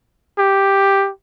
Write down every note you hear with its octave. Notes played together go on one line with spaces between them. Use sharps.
G4